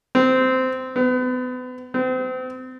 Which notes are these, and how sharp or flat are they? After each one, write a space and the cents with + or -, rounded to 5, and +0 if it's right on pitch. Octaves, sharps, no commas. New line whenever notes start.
C4 -15
B3 +35
C4 -35